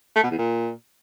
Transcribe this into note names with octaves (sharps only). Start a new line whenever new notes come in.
A3
B2
E2
A#2